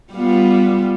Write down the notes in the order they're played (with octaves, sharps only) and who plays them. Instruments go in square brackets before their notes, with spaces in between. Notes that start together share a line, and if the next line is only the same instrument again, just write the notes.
[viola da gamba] G3 B3 F4